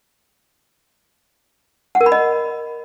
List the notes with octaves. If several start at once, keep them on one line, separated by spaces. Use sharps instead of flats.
F#5
A#4
B5
D#5